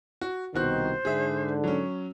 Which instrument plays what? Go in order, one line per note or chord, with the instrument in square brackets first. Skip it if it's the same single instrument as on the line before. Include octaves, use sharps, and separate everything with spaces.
[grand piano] F#4
[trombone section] C2 D#3 [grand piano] B2 F#4 F#6 [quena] C5
[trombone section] G#2 D3 [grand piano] G#4 E5
[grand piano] F#3 C#4